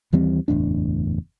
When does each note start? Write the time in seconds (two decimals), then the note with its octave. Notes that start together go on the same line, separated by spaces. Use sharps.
0.13 D#2 E3 G3 C4
0.48 F#1 E2 A2 D4